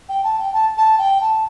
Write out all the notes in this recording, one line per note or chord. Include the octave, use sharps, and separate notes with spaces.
G5
A5
G5
A5
A5
G5
A5